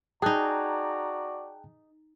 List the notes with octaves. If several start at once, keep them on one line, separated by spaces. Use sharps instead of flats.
D#4 F#4 G#4 D5 G5 A5 A#5 F#6